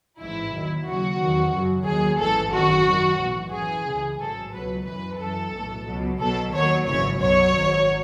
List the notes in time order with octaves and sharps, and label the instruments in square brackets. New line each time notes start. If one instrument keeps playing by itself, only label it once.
[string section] A1 G#2 E3 E4
D#2 D#3 F#3
D#2 C#3 F#3 F#4
E2 D#3 F#3
F#2 C#3 F#3
D#2 D#3 F#3 G#4
A1 G#2 E3 A4
G#1 F#2 D#3 F#4
F#2 D#3 F#3
B1 A2 E3
F#2 E3 G#4
C#2 C#3 E3
A1 G#2 F#3 A4
C#2 B2 F#3 B4
F#2 E3 B4
F#2 E3 A4
B1 A2 E3
C#2 B2 F#3
B1 B2 F#3 A4
D#2 D#3 F#3 C#5
G#1 F#2 C#3 E3 C#5
B1 B2 F#3 C#5
G#1 G#2 F#3